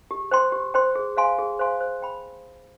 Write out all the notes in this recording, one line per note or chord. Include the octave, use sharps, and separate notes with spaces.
G4
C5 G5 C6
G4
C5 G5 C6
G#4
C5 F5 G#5 C6
G#4
C5 F5 G#5 C6
C5
G5 B5